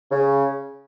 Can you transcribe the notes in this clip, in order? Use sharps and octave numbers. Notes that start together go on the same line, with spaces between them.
C#3